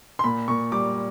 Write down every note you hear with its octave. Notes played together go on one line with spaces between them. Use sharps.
C6
A#2 B5
A#2 C#6
G3 D6